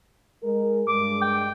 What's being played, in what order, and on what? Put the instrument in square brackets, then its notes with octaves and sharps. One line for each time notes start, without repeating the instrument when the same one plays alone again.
[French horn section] G#3 A#4
[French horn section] G2 G#3 [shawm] D6
[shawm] G5